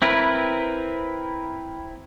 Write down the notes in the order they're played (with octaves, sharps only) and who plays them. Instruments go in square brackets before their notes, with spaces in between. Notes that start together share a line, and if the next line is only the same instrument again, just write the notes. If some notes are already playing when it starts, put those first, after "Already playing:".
[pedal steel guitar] C4 E4 A#4 B4